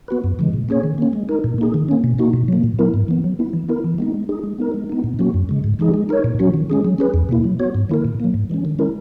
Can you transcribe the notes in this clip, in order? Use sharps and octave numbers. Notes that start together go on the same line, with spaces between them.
B3 F#4 B4
F#2
C#3 E3 G#3
A#2
A#3 C#4 G#4 C#5
D#3
A#3 C#4
G#3
D#4 A#4
A#2
A#3 D#4 G#4
D#3
A#3 C#4
B2
A#3 D#4 F#4
B2
F#3 A#3
A#2
F#3 B3 E4 A#4
G#2
E3 B3
F#3
B3 E4
E3
B3 E4 A#4
E3
G#3 B3 D#4
G#3
D#4 G#4
G#3
B3 D#4 A#4
G#3
B3 D#4
A#2
F#3 A#3 C#4 F#4
F#2
C#3 G#3
G#2
E3 G#3 D#4 G#4
G#3
D#4 A#4 C#5
A#2
F#3 C#4 F#4
D#3
G#3 C#4 G#4
F#3
C#4 G#4 B4
E2
B2 A#3 E4
F#3
B3 F#4 C#5
G#2
D#3 A#3 E4 A#4
A#2
F#3 A#3
G#2
E3 G#3 C#4
D#3
G#3 C#4 E4 A#4